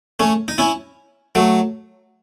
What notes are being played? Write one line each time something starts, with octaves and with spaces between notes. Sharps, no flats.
A3 C#4
D#4
C#4 E4
F#3 A3